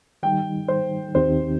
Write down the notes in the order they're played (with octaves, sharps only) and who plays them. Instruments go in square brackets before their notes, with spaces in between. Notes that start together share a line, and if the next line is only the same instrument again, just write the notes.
[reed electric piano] D#3 G3 D#4 [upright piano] G5
[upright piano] C5
[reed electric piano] D#2 D#3 C4 D#4 G4 [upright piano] C5